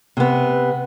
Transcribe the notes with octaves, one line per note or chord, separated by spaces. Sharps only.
C3 B3